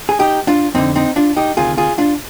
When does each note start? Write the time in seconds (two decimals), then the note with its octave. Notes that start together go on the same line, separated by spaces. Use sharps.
0.09 G#4
0.19 D#4 G4
0.47 D4 F4
0.74 F2 D3 C4 D#4
0.96 C4 D#4
1.16 D4 F4
1.36 D#4 G4
1.57 D2 C3 D#3 F4 G#4
1.77 F4 G#4
1.98 D4 F4